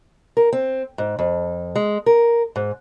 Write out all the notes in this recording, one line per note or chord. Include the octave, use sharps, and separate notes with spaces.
A#4
C4
G#2
F2
G#3
A#4
G#2